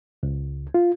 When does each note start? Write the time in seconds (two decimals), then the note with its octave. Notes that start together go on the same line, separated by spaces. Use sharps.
0.23 C#2
0.74 F4